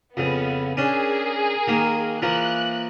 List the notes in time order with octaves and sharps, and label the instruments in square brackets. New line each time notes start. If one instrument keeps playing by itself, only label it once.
[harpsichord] F2 C#3 [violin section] B3
[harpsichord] C#4 D4 [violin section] G#4 A#4
[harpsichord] D#3 A#3
[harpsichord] E3 F3 A#3 [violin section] F#6